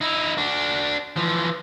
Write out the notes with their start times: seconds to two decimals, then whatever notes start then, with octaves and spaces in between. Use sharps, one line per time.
0.01 D#4 E4
0.38 D4 F#4
1.16 E3 F3